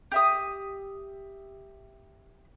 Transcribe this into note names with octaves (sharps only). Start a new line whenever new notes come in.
G4 E5 D#6